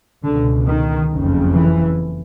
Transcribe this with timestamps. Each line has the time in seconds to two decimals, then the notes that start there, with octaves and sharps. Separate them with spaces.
0.23 C#2 B2 D3
0.67 D#3
1.11 F#1 F2 C#3
1.54 E3